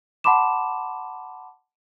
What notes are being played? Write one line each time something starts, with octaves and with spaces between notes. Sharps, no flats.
F#5 A5 B5 C6 D6 E7